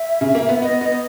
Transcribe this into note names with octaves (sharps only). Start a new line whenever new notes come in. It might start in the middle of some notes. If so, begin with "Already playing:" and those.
Already playing: E5
C#3
A#3
B3
B3 D#5
B3 D#5